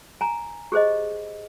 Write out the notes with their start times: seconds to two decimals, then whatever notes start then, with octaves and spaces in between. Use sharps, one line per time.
0.21 G#5 A#5
0.72 G4 G#4 C5 D#5